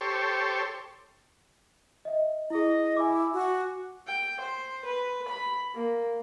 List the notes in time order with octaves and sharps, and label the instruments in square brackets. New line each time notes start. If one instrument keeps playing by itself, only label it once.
[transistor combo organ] G4 A4 C5 C#5
[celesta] D#5 E5
[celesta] E4 G#4 [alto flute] D#5
[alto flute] E4 [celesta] G#5 D6
[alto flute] F#4
[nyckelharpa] G5
C5
B4
B5
A#3